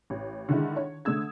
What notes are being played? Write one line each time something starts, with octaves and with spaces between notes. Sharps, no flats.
A1
D3 D#3 G#3 E4
C#5
D3 A3 D#6 E6 G#6